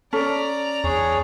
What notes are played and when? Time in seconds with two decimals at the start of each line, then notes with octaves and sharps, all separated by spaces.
0.13 C#4 A4 D5 A#5
0.84 E2 D4 G#4 C#5